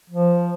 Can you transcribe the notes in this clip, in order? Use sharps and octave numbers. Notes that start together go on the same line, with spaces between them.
F3